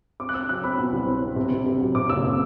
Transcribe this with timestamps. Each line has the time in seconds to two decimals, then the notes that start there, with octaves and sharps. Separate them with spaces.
0.20 C4 D6
0.29 F#6
0.34 C4 E6
0.49 F#3 F#6
0.64 C4 B5
0.79 B2
0.92 C2
1.07 C4
1.22 C4
1.36 C3
1.51 C3
1.66 C3
1.81 F#3
1.95 C3 D6
2.09 F#1 E6
2.24 C3